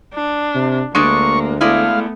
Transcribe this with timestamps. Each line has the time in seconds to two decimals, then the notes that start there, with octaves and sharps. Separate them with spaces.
0.14 D4
0.55 C3
0.95 D2 G#3 A#3 D4 D5 C#6
1.61 G#3 A3 B3 E4 D5 F5